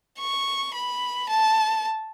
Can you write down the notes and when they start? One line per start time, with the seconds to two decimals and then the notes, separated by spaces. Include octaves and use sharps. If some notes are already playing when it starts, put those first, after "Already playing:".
0.20 C#6
0.74 B5
1.30 A5